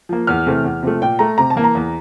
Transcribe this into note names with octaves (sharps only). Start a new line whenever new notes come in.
F3 A#3
E2 F6
C3 E3 A3
E2
C3 F3 A3
A#2 G5
A3 A#5
C3 A#5
A5
E3 A#3
A#5
E2